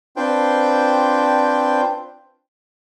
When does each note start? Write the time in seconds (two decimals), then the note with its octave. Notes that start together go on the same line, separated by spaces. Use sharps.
0.17 C4 D4 F4 B4 C5 G5